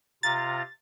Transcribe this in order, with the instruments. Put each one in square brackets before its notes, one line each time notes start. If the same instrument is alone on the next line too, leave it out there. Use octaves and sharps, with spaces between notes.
[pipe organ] C3 F4 A#5 [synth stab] A6